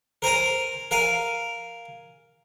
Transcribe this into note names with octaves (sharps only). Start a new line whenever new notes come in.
A#4 C5 G#5 A#5
A#4 F5 G#5